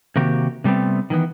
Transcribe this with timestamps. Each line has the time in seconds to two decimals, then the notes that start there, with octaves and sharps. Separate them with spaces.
0.16 C3 D#3 A#3 F#4 G4
0.64 C3 G3 A3 B3 C4
1.10 D#3 E3 B3